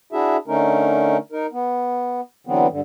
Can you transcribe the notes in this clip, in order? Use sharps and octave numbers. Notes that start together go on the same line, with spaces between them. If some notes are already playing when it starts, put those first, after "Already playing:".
D4 E4 F#4 G#4 E5
D3 A3 C#4 D#4 A#4
D#4 A#4
B3
D3 E3 F#3 B3 C4
G2 D3